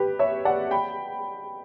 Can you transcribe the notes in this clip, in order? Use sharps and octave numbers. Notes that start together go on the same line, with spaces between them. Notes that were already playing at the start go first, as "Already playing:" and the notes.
Already playing: G4 B4
C#5 E5
D5 F#5
G5 B5